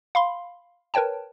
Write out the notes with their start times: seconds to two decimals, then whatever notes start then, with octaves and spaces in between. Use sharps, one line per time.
0.15 F5 B5 C6
0.94 A#4 B4 C#5 G5 A5